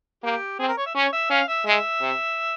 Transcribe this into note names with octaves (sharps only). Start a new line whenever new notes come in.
A#3 G4
C4 G#4
A#4
C#5
E5
C#4 C#5
E5
C#4 F5
E5
G#3 E5
C3